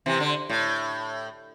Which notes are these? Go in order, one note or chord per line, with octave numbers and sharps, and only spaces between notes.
C3 E3
D3
A2